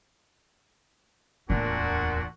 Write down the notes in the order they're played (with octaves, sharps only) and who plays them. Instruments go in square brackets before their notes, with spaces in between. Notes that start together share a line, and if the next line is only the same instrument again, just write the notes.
[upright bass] D1 E2 [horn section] A#2 D4 F#4